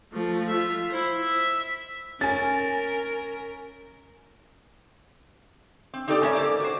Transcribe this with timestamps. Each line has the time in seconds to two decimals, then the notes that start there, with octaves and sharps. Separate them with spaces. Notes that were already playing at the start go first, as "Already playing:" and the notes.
0.12 F3 A3
0.50 F4 E5
0.90 E4 C5
1.23 E5
2.21 C#4 A#4 G#5 A6
5.94 C4
6.08 C4 D#4 G4 A4 D5
6.21 G#2 C#3 C#4 A#4 C#5 E5
6.33 A#3 A4 C5 D5
6.45 D5
6.60 F#4 C5